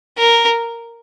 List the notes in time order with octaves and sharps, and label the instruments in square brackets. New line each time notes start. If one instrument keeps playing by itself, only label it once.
[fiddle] A#4